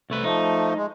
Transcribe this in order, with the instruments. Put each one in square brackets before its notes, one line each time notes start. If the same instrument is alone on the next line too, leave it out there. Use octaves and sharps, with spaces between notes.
[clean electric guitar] C2 A3 B4
[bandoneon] F3 A3 [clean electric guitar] D#4
[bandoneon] G#3